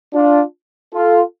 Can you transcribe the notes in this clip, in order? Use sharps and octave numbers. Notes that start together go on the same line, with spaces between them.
D4 F4
F4 A4